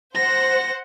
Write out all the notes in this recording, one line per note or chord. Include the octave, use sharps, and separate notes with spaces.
C5 F#5 A#6